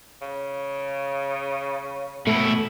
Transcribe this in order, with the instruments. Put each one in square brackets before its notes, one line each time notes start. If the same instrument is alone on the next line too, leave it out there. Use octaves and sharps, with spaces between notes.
[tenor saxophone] C#3
[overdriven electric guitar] B2 E4 [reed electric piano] A3